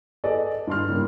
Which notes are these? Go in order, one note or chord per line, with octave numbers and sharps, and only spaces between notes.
G#4 A4 B4 D5 D#5
G2 D4 C6 F6
G#2 C#3 G3 A#3